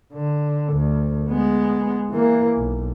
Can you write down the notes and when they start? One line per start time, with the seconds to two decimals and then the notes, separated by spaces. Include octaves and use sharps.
0.14 D3
0.73 D2
1.29 G#3 B3
2.10 E3 A#3
2.56 B1